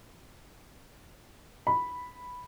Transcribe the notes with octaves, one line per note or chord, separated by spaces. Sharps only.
B5